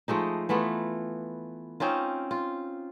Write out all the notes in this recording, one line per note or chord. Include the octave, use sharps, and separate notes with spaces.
F3 G#3 A3 D#4
E3 A3 B3 F4
C4 C#4 D#4 F4
F4